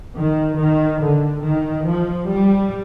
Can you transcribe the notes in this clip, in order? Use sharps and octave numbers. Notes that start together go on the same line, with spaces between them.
D#3
D#3
D3
D#3
F3
G3